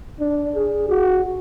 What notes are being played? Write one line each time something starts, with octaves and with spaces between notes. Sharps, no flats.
D4
G#4
F#4